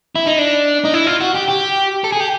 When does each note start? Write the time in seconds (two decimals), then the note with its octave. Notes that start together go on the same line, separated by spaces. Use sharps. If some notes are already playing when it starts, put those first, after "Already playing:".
0.16 E4
0.27 D#4
0.38 D4
0.85 D#4
0.94 E4
1.07 F4
1.21 F#4
1.36 G4
1.48 G4
2.04 A4
2.12 G#4
2.20 G4